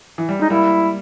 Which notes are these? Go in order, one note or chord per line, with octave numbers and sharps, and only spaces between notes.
E3
G3
G#3 D#4
G3 A#3 E4